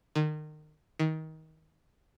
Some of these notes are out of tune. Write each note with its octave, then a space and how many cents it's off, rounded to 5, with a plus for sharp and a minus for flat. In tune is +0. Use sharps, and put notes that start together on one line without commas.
D#3 -30
D#3 +25